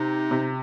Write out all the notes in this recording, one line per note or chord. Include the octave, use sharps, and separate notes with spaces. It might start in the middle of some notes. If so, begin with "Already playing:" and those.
Already playing: C3 D#4
C3